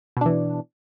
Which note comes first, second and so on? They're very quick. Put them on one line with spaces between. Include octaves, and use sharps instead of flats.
B2 D4 E3